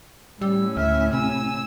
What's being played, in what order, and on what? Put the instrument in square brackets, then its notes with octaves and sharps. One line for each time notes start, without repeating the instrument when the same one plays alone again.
[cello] A2 C#4 [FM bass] G3 [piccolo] E6
[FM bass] D2 [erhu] E5 [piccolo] F6
[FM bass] C3 [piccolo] G#5 [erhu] E6